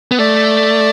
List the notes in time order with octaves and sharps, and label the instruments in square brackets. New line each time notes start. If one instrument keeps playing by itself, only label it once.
[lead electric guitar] B3
[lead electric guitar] A3 [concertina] D5